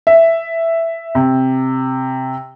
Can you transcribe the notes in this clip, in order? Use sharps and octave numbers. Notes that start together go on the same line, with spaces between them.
E5
C3